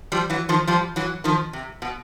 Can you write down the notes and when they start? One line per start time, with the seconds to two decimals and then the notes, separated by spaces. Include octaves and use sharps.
0.12 F3 G3
0.30 E3 F#3
0.49 D#3 F3
0.67 F3 G3
0.96 E3 F#3
1.24 D#3 F3
1.53 C3
1.82 B2